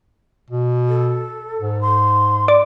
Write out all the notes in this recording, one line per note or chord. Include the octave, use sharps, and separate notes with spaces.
B2
A4
G#2
C6
D5